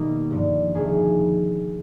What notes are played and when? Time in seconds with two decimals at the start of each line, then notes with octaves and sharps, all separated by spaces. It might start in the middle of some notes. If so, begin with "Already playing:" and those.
Already playing: B2 D#3 G3 A#3
0.31 G2 D3 F3
0.75 F2 C3 D#3 G#4